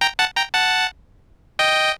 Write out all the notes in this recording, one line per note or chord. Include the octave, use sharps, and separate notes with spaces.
G5 A#5
F#5 A5
G5 A#5
F#5 A5
D#5 G5